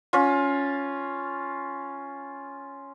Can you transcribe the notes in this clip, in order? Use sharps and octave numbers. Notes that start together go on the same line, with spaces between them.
C#4 F4